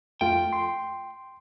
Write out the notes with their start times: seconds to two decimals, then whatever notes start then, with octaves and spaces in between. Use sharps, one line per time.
0.21 F2 A3 F4 G5
0.53 C6